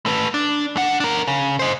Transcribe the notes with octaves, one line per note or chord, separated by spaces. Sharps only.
A3 B4
D4
D4 F#5
D4 A#4
C#3
C5 D#5